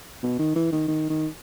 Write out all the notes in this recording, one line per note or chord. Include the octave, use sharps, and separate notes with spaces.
B2
D#3
E3
D#3
D#3
D#3